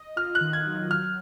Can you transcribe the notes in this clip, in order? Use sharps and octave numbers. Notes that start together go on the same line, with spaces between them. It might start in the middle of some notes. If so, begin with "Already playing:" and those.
Already playing: D#5
F4 F6
F#6
D#3
G#6
F#3
F#3 F6